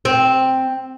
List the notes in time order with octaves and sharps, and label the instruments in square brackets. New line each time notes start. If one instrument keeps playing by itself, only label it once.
[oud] C4